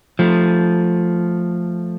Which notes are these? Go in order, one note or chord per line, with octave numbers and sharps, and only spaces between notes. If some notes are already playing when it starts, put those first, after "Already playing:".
F3 A3